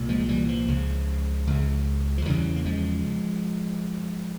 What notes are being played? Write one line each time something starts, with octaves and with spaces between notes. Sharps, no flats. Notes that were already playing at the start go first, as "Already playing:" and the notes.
Already playing: C2 A#2
F3 G#3
E3 G3
F3
C#2 C#3
C#2 C#3
F3
E2 C#3 E3 G3
A#3
F3 G#3